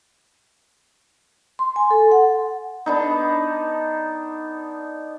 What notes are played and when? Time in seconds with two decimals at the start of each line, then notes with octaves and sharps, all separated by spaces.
1.59 C6
1.76 G#5
1.91 A4
2.12 F#5
2.86 B3 D4 D#4